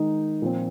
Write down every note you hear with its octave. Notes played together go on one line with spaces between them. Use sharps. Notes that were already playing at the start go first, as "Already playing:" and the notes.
Already playing: D#3 G#3 D#4
A#2 F3 C4